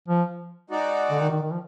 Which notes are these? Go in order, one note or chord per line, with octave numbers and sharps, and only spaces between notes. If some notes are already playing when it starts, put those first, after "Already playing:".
F3
G#3 D#4 F#4 D5
D3
D#3
D#3
D#3
F3